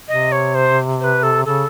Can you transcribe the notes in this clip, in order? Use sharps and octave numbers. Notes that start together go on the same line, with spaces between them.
C3 D#5
C#5
C5
C5
B4
A4
C#3 A4